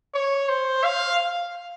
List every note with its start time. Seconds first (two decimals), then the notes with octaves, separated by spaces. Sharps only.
0.14 C#5
0.49 C5
0.84 F5